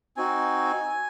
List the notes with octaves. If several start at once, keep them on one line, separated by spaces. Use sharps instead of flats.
C4 D#4 F#4 G#5